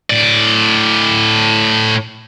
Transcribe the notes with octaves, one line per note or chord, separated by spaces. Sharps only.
A2 D5